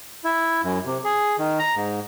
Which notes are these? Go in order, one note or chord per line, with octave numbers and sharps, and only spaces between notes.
E4
F#2
C3
G#4
D#3
A#5
G#2